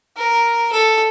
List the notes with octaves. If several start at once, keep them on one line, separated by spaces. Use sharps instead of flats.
A#4
A4